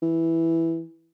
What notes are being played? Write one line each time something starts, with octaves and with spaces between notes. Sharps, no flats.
E3